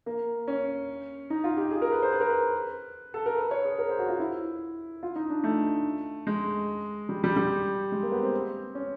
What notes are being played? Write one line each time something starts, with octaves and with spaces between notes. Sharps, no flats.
A#3
C#4
D#4
F4
G4
G#4
A#4
B4
C5
B4
A#4
B4
A4
A#4
B4
C#5
G#4
A#4
C5
F#4
F4
E4
F4
D#4
D4
A3
G#3
G3
G3
G3
G#3
A#3
B3
C4
C#4